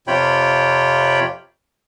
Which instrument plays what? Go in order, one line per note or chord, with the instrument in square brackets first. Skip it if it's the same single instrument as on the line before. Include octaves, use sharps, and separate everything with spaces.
[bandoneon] F2 C3 F4 C#5 G5 B5